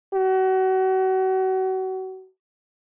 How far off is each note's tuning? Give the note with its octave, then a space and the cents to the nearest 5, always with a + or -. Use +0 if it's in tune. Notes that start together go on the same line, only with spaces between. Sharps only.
F#4 +30